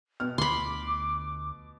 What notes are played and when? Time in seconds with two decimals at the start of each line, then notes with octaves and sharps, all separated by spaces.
0.20 B2 F6
0.38 D2 D3 F3 B5 C6 D6